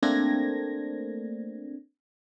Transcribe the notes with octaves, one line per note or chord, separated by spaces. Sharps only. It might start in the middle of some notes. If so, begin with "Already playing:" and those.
A3 A#3 C4 D4 G#6 A#6